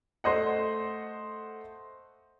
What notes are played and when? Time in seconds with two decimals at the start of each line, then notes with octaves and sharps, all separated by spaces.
0.24 A3 C5 D#5 F#5